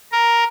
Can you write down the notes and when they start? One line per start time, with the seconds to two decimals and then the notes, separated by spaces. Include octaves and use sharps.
0.12 A#4